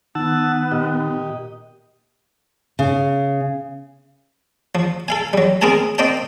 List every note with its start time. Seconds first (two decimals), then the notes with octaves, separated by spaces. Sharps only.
0.15 D#3 B3 F#5 A5 E6
0.72 A#2 G4 D#5
2.79 C#3
4.75 F3
5.08 A4 F5 G#5
5.33 F#3 G3
5.61 B3 C4 G#4 A#4 G#5 A5
5.98 A#3 C4 D5 D#5 G5 A5